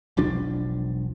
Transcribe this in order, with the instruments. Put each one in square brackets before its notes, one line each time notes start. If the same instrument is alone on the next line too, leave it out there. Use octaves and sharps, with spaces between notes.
[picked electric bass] E1 B1 F3 D4